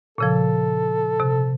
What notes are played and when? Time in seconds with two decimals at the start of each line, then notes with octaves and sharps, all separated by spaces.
0.18 A#2 C#3 F3 A4
1.20 C3